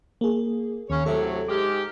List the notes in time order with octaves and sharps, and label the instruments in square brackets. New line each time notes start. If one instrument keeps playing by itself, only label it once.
[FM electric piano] A#3 G#4
[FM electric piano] D#2 [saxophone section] C#3 C#4 C#5
[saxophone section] A2 C3 F#3 [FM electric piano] A4 E5
[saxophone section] G#2 G#3 G4 [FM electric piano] D6 F6